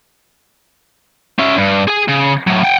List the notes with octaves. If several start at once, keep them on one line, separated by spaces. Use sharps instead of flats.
C#4 E5
G2
G#4 G#5
C#3
A2 F#3
F#5 G5